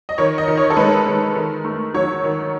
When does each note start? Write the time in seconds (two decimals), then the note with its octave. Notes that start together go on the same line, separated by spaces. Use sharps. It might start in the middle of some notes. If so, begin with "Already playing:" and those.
0.09 D#5
0.18 D#3 C#5
0.38 D#5
0.48 D#3
0.57 C#5
0.70 A4
0.77 G#3 B4
1.06 G#3
1.36 D#3
1.65 A3
1.94 F#3 C#5
2.24 D#3